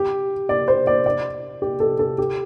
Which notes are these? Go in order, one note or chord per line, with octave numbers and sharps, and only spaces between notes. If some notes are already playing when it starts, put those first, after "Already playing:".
Already playing: G4
D5
C5
D5
D5
G4
A4
A4
G4